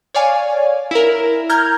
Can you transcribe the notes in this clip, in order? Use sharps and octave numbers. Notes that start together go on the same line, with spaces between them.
C#5 D5 F5 G#5
E4 A#4
A#5 F6 G6 G#6